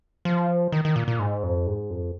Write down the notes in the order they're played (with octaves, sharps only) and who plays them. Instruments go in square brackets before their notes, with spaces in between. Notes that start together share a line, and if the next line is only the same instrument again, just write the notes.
[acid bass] F3
D#3
D#3
A#2
A#2
G#2
F2
G#2
F2